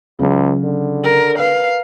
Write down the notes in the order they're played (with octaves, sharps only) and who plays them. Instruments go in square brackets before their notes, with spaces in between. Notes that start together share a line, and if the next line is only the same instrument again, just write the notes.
[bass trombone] C#2 [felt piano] C#3 F#3
[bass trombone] D3
[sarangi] A#4
[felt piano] B4 [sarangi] F5